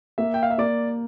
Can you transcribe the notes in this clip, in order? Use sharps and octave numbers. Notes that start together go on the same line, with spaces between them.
A#3 E5
G5
F5
E5
A#3 D5